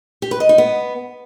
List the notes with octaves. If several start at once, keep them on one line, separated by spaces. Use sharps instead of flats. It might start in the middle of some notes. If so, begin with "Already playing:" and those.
G4
B4
D#5
D#4
B3